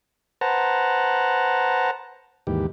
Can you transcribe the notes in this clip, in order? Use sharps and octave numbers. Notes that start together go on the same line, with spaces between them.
B4 C5 F#5 A5 A#5
D#2 G#2 E3 G4